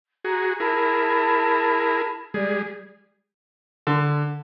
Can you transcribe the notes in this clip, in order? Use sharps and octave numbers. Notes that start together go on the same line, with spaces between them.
F#4 G#4 A#5
E4 G#4 A#4 A5 B5
G3 G#3 G#4 D5
D3